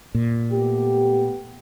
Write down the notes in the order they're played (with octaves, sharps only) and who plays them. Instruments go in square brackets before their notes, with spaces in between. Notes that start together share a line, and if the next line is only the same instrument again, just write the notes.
[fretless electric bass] A#2
[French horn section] A3 B3 G4